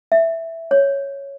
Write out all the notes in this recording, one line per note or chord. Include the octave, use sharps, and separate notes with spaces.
E5
C#5